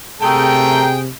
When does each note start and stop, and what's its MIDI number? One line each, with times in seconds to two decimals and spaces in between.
0.21 1.11 48
0.21 0.85 57
0.21 0.99 68
0.21 0.85 70
0.21 0.99 79